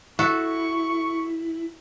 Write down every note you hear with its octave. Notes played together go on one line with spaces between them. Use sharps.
E4 F#4 A4 C#6